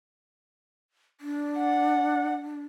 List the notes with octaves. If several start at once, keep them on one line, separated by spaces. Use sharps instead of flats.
D4
F#5